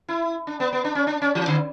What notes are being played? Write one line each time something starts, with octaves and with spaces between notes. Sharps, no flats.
E4
D4
B3
B3
D4
C#4
D4
C#4
E3
D3